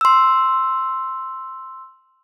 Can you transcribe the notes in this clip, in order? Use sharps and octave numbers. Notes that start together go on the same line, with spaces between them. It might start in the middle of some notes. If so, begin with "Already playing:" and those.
C6 E6